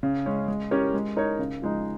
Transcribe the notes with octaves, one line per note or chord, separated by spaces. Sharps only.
C#3
G#3 C#4
G#3
C#4 G4 A#4 C#5
G#3
D#4 A#4 C#5
C#3
F3 G#3 D#4